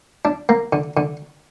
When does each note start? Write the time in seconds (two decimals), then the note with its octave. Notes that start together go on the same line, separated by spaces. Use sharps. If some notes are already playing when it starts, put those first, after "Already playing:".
0.25 D4
0.49 A#3
0.73 D3
0.97 D3